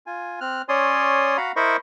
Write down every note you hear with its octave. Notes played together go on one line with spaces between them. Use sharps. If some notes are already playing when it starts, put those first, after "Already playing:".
F4 G#5
C4 F6 F#6
C#4 C#5 D5 C6 D#6
F#4 F5 F#5 A#5 B5
E4 A#4 C5 D#5 B5 C#6